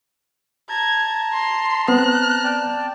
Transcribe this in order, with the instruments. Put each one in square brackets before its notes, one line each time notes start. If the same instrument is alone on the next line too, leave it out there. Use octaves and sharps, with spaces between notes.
[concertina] A5 A#5 [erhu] G#6
[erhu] C6
[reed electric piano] B3 C4 [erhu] F#6
[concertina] D5 G5 A5